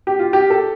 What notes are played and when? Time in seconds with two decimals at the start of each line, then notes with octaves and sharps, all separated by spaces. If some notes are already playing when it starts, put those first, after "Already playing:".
0.07 G4
0.19 F4
0.33 G4
0.50 A4